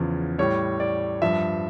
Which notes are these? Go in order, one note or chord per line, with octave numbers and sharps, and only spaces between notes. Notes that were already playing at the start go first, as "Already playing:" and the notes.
Already playing: E2 C#3 F3
A2 G3 C#5
D5
G2 F3 E5